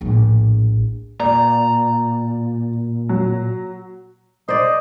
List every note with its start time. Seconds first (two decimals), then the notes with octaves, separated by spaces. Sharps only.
0.01 A#1 A2
1.20 A#2 D5 A#5
3.09 F#3
4.48 C5 D5 D#5